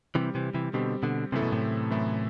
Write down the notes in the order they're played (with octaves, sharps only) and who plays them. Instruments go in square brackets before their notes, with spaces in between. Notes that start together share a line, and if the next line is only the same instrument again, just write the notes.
[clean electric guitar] C3 E3 [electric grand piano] G3 C4 G4
[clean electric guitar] C3 E3
C3 E3
[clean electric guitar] B2 D3 [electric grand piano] G3 C4 G4
[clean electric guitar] B2 D3
[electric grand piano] F#2 E3 A3 E4 A4 [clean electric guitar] C3
[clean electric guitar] B2
A2 C3
[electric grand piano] F#2 E3 A3 E4 A4